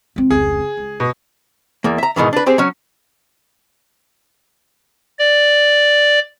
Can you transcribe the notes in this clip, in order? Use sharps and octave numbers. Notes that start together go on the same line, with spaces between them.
C#2 C4
F1 C#2 G#4
C#2
B2
E2 A#3
E5 A#5
G#2 B2 D#3 E3
D4 B4
C4 G4 G#4 C5
F#3 C#4
D5